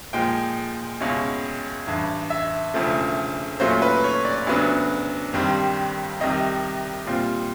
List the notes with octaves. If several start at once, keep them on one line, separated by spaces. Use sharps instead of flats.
A#2 F3 G#3 G5
C#2 B2 G#3 C#4 E4
A1 G2 E3
E5
E1 D2 C#3 F3 A3
A#2 F#3 A3 C#4 F4 C5
B4
C#5
D5
D2 C#3 F#3 B3 D4
G#1 G2 D#3 G3 C4
C2 C3 D#3 G3 D#5
A#2 G3 C4 F4